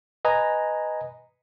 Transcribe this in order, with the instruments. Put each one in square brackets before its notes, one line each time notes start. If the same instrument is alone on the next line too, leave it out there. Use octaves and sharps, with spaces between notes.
[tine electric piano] B4 D#5 G#5 A#5